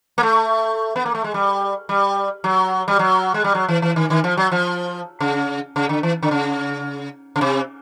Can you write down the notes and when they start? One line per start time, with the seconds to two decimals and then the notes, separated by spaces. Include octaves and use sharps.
0.18 A#3
0.23 A3
0.96 B3
1.06 A#3
1.15 A3
1.24 G#3
1.34 G3
1.89 G3
2.44 F#3
2.88 G3
2.99 F#3
3.34 G#3
3.44 G3
3.55 F#3
3.68 E3
3.82 E3
3.96 D#3
4.10 D#3
4.24 F3
4.37 F#3
4.52 F3
5.20 C#3
5.76 C#3
5.89 D3
6.03 E3
6.22 D3
6.31 C#3
7.36 C#3
7.41 C3